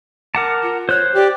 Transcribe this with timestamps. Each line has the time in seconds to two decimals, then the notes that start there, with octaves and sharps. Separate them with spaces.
0.35 A#4 F#5 A5 D6
0.62 F4
0.89 C5 C#5 F#6
1.15 G4 D5